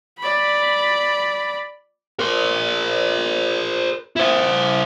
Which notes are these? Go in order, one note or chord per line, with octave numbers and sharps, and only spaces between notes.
D5 B5
A#4 C5
E4 C5